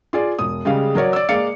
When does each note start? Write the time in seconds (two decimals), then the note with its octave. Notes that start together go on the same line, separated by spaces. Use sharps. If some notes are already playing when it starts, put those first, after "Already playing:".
0.13 F4 G#4 D5
0.39 E1 D#6
0.65 C#3 G3 G#3 F5
0.95 F#3 A#4 C#5 D5
1.13 D5 E6
1.29 G#3 A#3 D5 F5 C#7